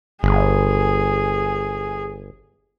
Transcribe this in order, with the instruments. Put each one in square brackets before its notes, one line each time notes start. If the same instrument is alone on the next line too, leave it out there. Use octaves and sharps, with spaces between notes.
[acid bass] G1 [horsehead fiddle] G#4